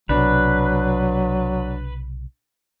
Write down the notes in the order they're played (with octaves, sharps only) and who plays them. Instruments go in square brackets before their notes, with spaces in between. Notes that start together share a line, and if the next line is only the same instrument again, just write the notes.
[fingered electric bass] B1 C3 [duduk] F#3 [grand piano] D4 [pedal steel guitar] B4